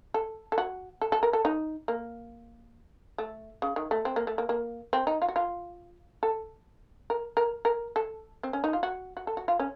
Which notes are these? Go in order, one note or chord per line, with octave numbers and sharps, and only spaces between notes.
A4
A4
F#4
A4
A4
A#4
A4
D#4
A#3
A3
C#3
D#3
A3
C4
A#3
A3
A#3
A#3
C4
D#4
F4
F#4
F4
A4
A#4
A#4
A#4
A4
C4
C#4
D#4
F4
F#4
F#4
A4
F#4
F4
C#4